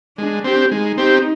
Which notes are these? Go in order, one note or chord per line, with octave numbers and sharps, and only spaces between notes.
G#3 D4
C4 G4
G#3 D#4
C4 G4